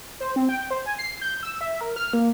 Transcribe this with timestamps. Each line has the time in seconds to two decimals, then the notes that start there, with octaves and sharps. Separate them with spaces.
0.20 C5
0.36 C4
0.49 G5
0.71 C5
0.86 G#5
0.98 C7
1.21 G6
1.43 E6
1.61 E5
1.81 A#4
1.96 F6
2.13 A#3